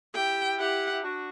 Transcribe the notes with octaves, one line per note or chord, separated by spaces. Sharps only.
E4 G4 G5
E4 G4 F#5
E4
D4 F#4